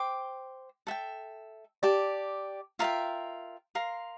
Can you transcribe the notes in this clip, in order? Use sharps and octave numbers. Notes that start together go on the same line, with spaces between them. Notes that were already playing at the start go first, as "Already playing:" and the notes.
Already playing: C5 G5 D6
A4 E5 G5
G4 D5 A5
F4 A#4 E5 G5
A#4 F5 C6